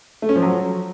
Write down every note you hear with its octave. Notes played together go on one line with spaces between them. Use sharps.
A3
C#4
F3
F#3